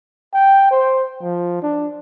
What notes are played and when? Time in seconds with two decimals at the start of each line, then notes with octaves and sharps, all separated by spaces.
0.34 G5
0.71 C5
1.22 F3
1.63 D4